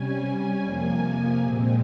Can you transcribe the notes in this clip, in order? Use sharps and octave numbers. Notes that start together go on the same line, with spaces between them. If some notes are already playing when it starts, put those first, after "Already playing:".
Already playing: C3 G3 C#4 G#5
G#5
F2 C3 F3 A#3
A#2 G#3 C4